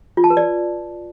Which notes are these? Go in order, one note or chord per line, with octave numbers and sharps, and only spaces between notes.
F4
A5
B4
D5